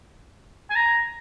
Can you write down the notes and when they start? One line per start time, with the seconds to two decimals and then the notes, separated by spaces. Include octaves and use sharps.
0.70 G#5
0.75 A#5